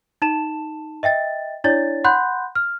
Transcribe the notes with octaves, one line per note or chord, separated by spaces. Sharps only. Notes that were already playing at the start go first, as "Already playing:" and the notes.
D#4 A5 E7
D#5 E5 G5 A6
D4 E4 C#5 D5 A6
F#5 B5 C6 F#6 G6
F6